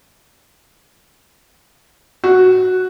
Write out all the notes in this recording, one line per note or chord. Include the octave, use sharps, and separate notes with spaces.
F#4